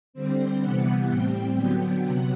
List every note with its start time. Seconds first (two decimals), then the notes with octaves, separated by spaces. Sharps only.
0.14 D3 G3 C4 C5
0.61 C3 E3 G3 B3 F#5
1.08 A2 G3 C4 G5
1.55 D3 F#3 B3 G5
2.02 C3 F#3 B3 F#5